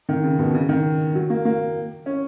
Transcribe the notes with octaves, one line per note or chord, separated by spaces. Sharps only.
D#3
C#3
B2
C#3
D#3
F#3
A#3
A#3
C#4